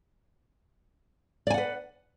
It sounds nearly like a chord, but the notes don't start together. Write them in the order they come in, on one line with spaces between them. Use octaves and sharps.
D5 G#5 F#5 B4